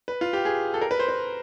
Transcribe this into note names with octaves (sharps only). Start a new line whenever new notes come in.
B4
F4
G4
G#4
A4
A#4
B4
C5
B4